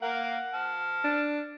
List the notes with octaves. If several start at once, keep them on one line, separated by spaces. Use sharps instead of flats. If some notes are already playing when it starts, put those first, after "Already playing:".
A#3 A#4 F5 F#5
A5 F6
D4